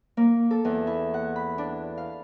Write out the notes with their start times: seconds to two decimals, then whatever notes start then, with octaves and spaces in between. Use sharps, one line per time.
0.17 A#3
0.51 A4
0.65 E2
0.87 E4
1.14 F#5
1.36 B5
1.58 D4
1.98 F5